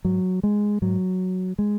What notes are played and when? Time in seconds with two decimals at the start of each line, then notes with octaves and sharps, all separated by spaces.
0.05 G#2 F#3
0.43 G#3
0.82 G#2 F#3
1.59 G#3